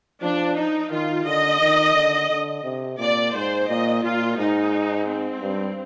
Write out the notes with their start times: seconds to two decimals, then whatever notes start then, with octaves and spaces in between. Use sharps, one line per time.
0.22 F3 D4
0.56 D#4
0.91 D#3 F4
1.26 D3 D#5
1.61 D#3
1.95 D3
2.30 D3
2.64 C3
2.99 A#2 D5
3.33 G#2 C5
3.68 A#2 D#5
4.03 A#2 F4
4.37 G#2 D#4
5.07 C4
5.41 G2